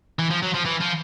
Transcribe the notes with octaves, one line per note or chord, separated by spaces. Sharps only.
E3
F3
F#3
F3
E3
F3